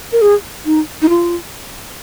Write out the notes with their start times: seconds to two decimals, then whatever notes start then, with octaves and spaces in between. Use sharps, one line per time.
0.12 A#4
0.22 G#4
0.66 D#4
1.02 D#4
1.09 F4